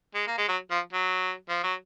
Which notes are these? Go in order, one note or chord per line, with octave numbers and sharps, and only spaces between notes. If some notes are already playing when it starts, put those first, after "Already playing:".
G#3
A#3
G#3
F#3
F3
F#3
F3
F#3